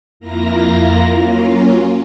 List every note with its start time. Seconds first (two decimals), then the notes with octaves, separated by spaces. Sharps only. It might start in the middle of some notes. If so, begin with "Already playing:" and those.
0.20 F2 A#3 E4 F4 A#5 A#6
1.13 F#3 A#3 C#4 F4